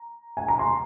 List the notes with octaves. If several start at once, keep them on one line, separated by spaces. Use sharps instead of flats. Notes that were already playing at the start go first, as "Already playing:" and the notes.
Already playing: A#5
G#5
A#5
C6